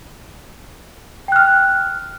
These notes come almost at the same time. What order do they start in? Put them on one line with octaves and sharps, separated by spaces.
G5 F#6 F6